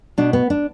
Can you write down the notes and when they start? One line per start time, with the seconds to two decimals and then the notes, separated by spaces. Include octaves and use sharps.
0.18 B2 D4
0.33 B3
0.50 D4